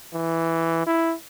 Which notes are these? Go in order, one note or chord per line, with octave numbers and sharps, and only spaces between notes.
E3
E4